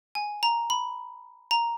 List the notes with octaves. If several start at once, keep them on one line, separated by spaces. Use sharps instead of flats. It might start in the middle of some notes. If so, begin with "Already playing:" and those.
G#5
A#5
B5
A#5